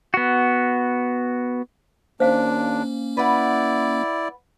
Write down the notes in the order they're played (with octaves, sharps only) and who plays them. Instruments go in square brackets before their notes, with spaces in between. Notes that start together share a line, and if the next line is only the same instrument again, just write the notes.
[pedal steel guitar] B3 F#4
[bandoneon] D#2 D4 [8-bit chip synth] A#3 C#4 [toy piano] C5 F5
[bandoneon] E4 D5 [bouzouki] B4 F#5